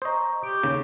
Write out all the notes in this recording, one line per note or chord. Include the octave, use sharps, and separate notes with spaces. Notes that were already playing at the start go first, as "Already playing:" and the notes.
C5 D#5 A#5 C#6 D#6
G4 D7
D#2 C#3